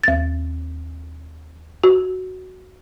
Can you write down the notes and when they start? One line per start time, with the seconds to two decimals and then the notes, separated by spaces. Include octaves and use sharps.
0.04 D#2 A6
1.84 F#4